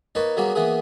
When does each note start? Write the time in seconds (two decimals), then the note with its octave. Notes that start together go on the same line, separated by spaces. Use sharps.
0.15 A#3 D#4 B4 C#5 A5
0.37 F#3 G3 A#3 B3 G#4
0.55 E3 A#3 B3 G#4